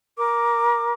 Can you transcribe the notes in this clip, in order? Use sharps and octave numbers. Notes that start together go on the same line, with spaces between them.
A#4 D6